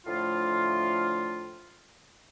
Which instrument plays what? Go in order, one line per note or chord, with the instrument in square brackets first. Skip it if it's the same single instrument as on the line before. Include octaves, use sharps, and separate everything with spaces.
[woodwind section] A2 D3 F3 A3 F4